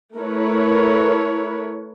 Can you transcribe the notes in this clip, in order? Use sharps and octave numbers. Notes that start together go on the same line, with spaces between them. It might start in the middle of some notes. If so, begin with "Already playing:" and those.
A3 E4 A#4 B4 C#5